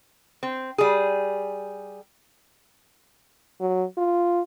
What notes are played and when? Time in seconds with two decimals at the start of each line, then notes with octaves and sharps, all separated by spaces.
0.43 C4
0.78 G3 G#4
3.60 F#3
3.98 F4